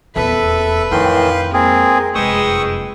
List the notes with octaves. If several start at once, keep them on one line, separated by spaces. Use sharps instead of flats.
D#1 E2 A4 B4 E5
F2 A2 D#3 E3 F5 G5 C6
G#3 A#3 C4 G#4 A#4
F1 F#2 G#3 B4 G5 C#6 D#6 E6